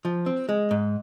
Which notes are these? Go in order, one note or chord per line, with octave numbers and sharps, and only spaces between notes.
F3
C4
G#3
G#2